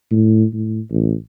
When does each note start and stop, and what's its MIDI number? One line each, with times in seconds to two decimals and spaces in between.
0.11 0.45 45
0.53 0.80 45
0.91 1.14 33